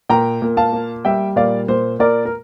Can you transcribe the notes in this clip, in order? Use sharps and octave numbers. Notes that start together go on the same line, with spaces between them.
A#2 G5 A#5
A#2
F5 A5
A#3
G3 E5 G5
A#2 D5 F5
A#2 C5
A#2 A#4 D5
A#4